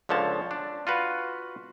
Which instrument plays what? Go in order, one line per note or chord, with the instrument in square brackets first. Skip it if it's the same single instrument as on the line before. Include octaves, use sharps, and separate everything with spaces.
[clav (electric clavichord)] C#2 D3 F3 C#5 A5
D4
F4 F#4 B4